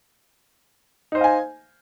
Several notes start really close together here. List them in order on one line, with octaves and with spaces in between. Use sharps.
D#4 C5 D#5 F5 G#5